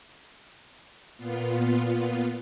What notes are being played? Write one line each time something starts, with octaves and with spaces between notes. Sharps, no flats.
A#2 B3 F4